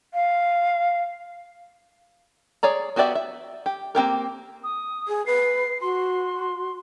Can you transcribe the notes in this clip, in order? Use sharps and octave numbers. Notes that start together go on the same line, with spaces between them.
F5
G#4 C#5 D5 A#5
B3 F#4 G4 D5 E5
E5
G4
A#3 C4 G4 A#4
D#6
G#4
B4 C7
F#4 C6